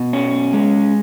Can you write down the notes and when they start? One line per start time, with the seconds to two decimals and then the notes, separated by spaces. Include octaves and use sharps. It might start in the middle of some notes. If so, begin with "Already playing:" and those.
Already playing: B2
0.13 C#4
0.53 G#3